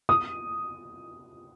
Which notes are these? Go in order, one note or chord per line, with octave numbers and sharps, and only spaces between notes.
D#6